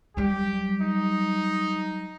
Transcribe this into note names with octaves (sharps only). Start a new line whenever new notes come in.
F#3 G3 G4
D#4